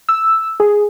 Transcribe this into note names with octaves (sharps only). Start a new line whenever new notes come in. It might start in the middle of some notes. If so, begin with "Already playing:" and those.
E6
G#4